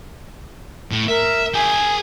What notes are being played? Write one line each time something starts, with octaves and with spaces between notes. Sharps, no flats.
A2
A#4 E5
G#4 G5 G#5